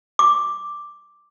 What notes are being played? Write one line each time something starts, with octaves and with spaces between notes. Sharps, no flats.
D6